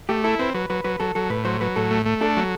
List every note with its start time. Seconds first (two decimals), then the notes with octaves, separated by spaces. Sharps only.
0.09 A3 G4
0.24 E4 A4
0.39 C4 B4
0.54 F#3 B4
0.70 F#3 B4
0.84 F#3 B4
1.00 F#3 A4
1.15 F#3 A4
1.30 A2 B4
1.45 F#3 C5
1.61 F#3 B4
1.76 A2 A4
1.91 A3
2.06 A3
2.21 D4 A4
2.37 F#3